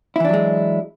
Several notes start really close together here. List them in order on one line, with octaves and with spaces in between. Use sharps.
E4 E3 D4 F#3 G#3